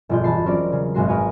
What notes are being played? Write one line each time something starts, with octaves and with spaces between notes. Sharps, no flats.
G1 F2 B2 F4 G#4 G6
E1 A5 B5 C7
F#3 C4 C#4 A#4 C5 D5
C#3
G#1 F#2 B2 G#3 F#4 C7
A#4 B4 C#5 F5 G#5 D#6